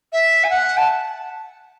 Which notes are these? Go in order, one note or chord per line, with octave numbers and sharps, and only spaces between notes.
E5
G#5
F#5
A5